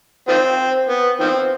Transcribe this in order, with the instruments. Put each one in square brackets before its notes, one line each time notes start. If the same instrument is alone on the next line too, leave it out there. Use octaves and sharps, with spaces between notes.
[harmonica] D#3 F3 C4
B3
D#3 F3 C4